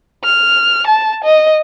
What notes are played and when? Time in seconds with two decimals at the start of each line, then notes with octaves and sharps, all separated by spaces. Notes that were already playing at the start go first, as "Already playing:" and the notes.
0.24 F6
0.87 A5
1.24 D#5